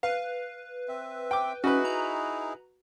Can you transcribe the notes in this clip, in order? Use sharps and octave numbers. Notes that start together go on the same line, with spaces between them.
B4 F5
C4 E5
G5 D6
C#4 D#4 E4 F#4 G#4 B4
A#5